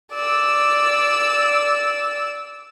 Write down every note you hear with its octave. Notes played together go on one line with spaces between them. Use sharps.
D5 E6